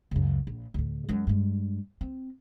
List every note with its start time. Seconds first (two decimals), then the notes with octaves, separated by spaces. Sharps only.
0.11 C#2 F#2
0.47 A#1
0.74 D2 A2
1.09 F#2 G#3
1.27 G2 G#3
2.01 C4